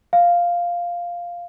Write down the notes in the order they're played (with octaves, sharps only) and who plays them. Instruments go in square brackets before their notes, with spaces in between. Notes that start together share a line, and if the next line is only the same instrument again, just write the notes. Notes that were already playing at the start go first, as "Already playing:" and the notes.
[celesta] F5